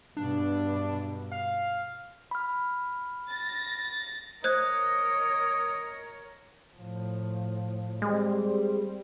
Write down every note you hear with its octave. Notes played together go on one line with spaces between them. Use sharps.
G2 B2 D4
F5
B5 F6
A6 A#6
A#4 C5 C#5 D#5 F#6 G#6
A2 F3
G3 G#3 C4